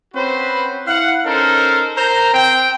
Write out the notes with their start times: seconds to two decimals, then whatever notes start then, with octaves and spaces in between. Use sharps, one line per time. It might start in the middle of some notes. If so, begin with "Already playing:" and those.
0.14 C4 C#4 F#4 B4 C5
0.87 E4 F5 F#5
1.25 C#4 D#4 A4 A#4 C5
1.96 A#4 C5 A#5
2.34 C4 G5